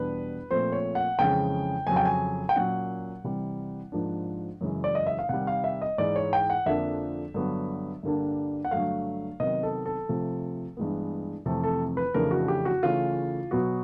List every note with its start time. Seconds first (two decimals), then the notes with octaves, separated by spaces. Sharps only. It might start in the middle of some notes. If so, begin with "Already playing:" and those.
Already playing: E2 B2 G3 B3 D4 B4
0.51 A#2 F3 A3 C4 C5
0.72 C#5
0.95 F#5
1.19 F2 C#3 E3 G#3 C#4 G5
1.87 F2 C#3 F#3 G#5
1.96 G5
2.05 G#5
2.49 G5
2.56 A#2 F#3 A#3 C#4 F#5
3.24 C3 E3 G3
3.92 G#2 F3 A#3 D4
4.61 F#2 C#3 E3 G#3 C#4
4.84 D5
4.95 D#5
5.07 E5
5.19 F5
5.29 C3 D#3 G3 F#5
5.47 F5
5.64 E5
5.82 D#5
5.98 G#2 E3 G#3 D5
6.16 C#5
6.33 G5
6.50 F#5
6.66 F2 D3 F3 A#3 D4 E5
7.34 G2 D3 F#3 B3
8.03 G2 D3 G3 A#3 D4
8.65 F#5
8.71 G2 D3 F#3 A3 F5
9.40 C3 D#3 F#3 B3 D#5
9.63 A4
9.86 A4
10.09 C3 F3 A3
10.77 G2 E3 G#3 B3
11.46 F2 C3 E3 A3 A4
11.64 A4
11.97 B4
12.14 F2 C#3 E3 A3 D4 A#4
12.31 F#4
12.48 G4
12.65 F#4
12.83 C#3 E3 A3 C#4 F4
13.51 B2 F#3 B3 F#4